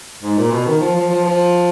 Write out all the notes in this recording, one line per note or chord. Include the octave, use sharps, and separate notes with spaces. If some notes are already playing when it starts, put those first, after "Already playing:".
G#2
A#2
B2
D#3
F3
F3
F3
F3